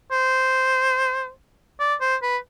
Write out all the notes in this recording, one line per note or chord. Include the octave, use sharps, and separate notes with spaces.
C5
D5
C5
B4